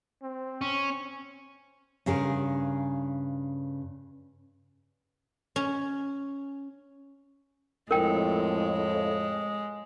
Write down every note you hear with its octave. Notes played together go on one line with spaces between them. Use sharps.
C4
C#4
G2 C#3 G#4 A#4
C#4
F2 A2 G#3 A#4 G5